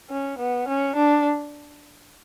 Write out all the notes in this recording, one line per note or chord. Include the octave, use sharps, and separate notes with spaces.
C#4
B3
C#4
D4